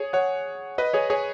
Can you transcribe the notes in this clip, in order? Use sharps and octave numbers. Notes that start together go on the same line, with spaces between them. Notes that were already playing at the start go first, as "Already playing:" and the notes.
Already playing: G#4 C#5
C#5 F#5
B4 D#5
G#4 C#5
G#4 C#5